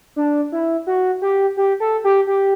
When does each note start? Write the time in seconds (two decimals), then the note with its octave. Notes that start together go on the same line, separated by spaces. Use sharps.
0.16 D4
0.52 E4
0.87 F#4
1.22 G4
1.57 G4
1.80 A4
2.04 G4
2.27 G4